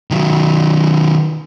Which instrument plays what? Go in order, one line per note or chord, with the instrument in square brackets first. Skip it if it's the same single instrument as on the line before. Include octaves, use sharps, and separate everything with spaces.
[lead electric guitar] D#3 F#3